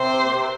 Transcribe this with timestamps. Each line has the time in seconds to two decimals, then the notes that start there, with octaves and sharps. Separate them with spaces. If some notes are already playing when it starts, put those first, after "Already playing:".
Already playing: C3 C4 C5
0.22 A#3
0.30 C3 C4